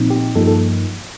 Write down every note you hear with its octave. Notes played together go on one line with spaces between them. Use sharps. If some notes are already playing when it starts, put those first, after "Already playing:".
Already playing: A#2 F3 C4 D#4
G4
G2 F3 A#3 D#4 A4
A4